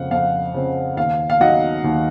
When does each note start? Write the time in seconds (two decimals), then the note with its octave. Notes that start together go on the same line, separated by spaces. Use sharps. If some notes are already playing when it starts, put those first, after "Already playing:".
Already playing: F2 C#3 F3 C4 F5 F#5
0.11 F2 F5
0.54 C#3 F3 C4
0.97 D#2 F5
1.30 F5
1.40 D#3 F#3 D#5 F#5
1.84 D#2